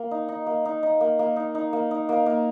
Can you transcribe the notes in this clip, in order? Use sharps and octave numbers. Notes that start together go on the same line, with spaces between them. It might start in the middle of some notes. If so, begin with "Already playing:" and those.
Already playing: A#3
D#4
D#4
A#3
D#4
D#4
A#3
A#3
D#4
D#4
A#3
D#4
A#3
A#3